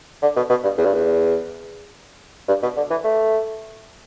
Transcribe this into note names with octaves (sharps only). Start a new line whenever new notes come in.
D3
B2
B2
G2
E2
G2
E2
G2
B2
D3
E3
A3